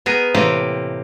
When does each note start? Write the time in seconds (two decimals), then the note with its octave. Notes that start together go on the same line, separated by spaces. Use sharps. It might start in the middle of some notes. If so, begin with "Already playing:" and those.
0.06 B3 G#4 A#4
0.35 A2 C3 E3 A#3 G4